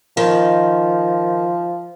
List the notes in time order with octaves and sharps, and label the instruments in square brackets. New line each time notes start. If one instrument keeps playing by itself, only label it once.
[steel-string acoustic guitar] D#3 [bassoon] F3